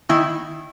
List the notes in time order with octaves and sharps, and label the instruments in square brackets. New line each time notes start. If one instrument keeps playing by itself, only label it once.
[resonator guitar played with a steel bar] D#3 E4